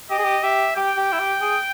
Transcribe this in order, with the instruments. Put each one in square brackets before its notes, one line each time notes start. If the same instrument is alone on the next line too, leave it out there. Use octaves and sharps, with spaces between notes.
[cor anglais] G4 [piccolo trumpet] D#5
[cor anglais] G#4
G4
[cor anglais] G4 [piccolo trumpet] E5
[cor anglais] G4 [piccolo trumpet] G5
[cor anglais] G4
E4
G4
G#4